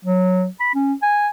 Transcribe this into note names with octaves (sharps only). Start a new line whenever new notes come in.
F#3
B5
C#4
G#5